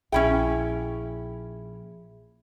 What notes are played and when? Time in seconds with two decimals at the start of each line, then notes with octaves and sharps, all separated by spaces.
0.12 A#1 C#4 E4 G#4 E5 G5